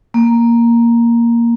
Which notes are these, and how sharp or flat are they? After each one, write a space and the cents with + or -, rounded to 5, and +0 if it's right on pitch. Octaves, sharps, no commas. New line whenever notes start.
A#3 +5